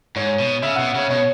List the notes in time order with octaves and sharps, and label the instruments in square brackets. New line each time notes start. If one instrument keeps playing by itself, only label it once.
[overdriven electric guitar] G#2 [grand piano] C#5
[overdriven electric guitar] B2
[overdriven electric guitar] C#3 [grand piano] E5
[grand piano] F#5
[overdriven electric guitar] B2
[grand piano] E5
[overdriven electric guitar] C#3 [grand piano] C#5
[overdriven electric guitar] B2 [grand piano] C#5